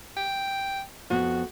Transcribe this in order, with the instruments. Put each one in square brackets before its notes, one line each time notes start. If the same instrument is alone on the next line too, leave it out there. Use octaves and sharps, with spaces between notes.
[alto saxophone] G5
[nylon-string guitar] F2 B3 [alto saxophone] F#4